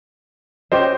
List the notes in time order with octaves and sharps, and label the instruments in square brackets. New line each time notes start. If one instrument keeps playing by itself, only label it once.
[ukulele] C#4 G4 D#5 [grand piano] C5